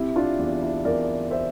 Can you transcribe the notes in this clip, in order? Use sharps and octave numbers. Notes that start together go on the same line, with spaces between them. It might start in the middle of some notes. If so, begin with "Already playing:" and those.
Already playing: C3 E4
D4 F4
E2
E4
E2 A#4 D5
C5 E5